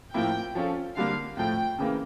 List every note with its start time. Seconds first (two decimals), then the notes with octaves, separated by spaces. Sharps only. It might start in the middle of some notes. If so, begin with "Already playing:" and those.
0.14 A2 F3 A#3 E4 G5
0.55 F3 C#4 F4 A4
0.96 D3 G3 A#3 F5
1.37 A2 F3 A3 G5
1.79 C#3 E3 A#3